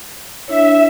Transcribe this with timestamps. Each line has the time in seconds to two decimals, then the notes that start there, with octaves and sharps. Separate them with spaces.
0.48 D4 E4 C#5 E5